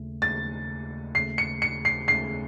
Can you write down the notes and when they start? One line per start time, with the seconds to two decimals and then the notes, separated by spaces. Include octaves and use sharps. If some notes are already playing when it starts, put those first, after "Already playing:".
Already playing: D#2 C#3 A3
0.22 D#2 C#3 A3 A6
1.15 D#2 C#3 A3 C7
1.38 C#7
1.62 C#7
1.85 C7
2.08 D#2 C#3 A3 C7